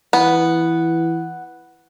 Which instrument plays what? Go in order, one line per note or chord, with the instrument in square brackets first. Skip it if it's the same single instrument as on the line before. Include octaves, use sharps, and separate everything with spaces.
[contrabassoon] E3 [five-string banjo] B3